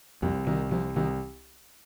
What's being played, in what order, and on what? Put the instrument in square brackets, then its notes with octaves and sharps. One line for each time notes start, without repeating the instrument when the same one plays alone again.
[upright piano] C2 [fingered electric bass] F2
[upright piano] C2 [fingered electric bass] D#3
[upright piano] C2 [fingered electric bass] F3
[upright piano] C2 [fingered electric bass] D#3